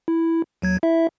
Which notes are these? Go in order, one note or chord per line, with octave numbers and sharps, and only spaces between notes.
E4
D#2 F#3 G#6
E4 E5